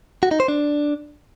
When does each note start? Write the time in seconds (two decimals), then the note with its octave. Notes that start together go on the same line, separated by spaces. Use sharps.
0.23 F#4
0.31 D#4
0.40 C5
0.48 D4